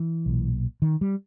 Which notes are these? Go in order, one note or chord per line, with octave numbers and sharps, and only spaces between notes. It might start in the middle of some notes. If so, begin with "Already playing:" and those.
Already playing: E3
B1 A#2
D#3
G3